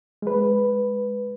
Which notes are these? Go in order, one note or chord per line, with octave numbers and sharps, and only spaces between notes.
G#3 B4